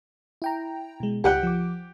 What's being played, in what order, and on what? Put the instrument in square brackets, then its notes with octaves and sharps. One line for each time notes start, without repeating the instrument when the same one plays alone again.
[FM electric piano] E4 G5 A#5
B2 G#3
[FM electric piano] C#2 [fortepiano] G4 F#5 G5
[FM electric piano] F3 D6